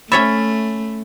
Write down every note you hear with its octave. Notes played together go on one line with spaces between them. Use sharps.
A3 C#4 C#5 E5 B5 A6